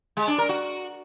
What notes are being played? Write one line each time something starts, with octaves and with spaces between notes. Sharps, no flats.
G#3
D4
A#4
F#4